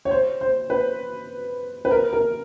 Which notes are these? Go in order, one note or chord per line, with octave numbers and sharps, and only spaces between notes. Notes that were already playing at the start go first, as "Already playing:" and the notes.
C#5
C5
C5
B4
B4
A#4
A#4